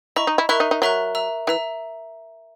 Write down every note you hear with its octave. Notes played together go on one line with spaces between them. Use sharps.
E4 D#5 A#5 C#6
D#4
E4
E4 A#4 E5 A#5 C#6 F#6
D#4
D#4
F#3 A#4 E5 A#5 C#6 F#6
E5 A#5 E6
E3 E5 A#5 E6